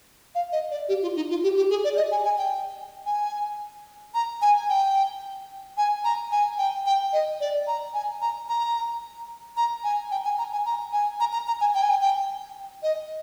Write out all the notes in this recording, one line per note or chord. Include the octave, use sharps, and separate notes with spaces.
F5
D#5
D5
G4
F4
D#4
F4
G4
G4
G#4
D5
D#5
G#5
G#5
G5
G#5
A#5
G#5
G5
G#5
A#5
G#5
G5
G5
D#5
D5
A#5
G#5
A#5
A#5
A#5
G#5
G5
G#5
A#5
G#5
A#5
G#5
A#5
A#5
A#5
G#5
G5
G#5
G5
G5
D#5